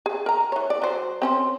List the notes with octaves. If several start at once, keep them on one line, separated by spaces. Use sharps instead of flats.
G#4
A#4 A#5
E3 C#5
D5
F#3 C5
C4 C#4 C5